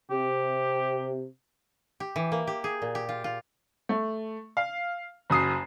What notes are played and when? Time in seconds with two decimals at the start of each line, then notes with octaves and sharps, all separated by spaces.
0.11 C3 G4
2.00 G4
2.16 E3
2.32 A#3
2.47 G4
2.64 G#4
2.82 A#2
2.95 G4
3.09 F4
3.24 F4
3.89 A3
4.57 F5
5.30 F#1 F#2 D#6 C7